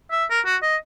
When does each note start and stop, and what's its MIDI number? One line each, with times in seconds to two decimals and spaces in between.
0.11 0.25 76
0.30 0.40 70
0.46 0.56 66
0.63 0.76 75